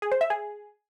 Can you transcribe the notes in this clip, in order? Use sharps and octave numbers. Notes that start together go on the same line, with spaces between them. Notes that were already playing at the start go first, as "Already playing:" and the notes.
G#4
C5
E5
G#4